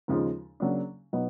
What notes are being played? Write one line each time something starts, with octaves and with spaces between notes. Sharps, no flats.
D#2 C#3 F3 G#3
C#3 F#3 A#3 D4
B2 F#3 B3 D#4